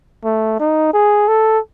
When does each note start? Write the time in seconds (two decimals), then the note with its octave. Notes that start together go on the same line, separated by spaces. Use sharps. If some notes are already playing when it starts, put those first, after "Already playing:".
0.24 A3
0.59 D#4
0.93 G#4
1.28 A4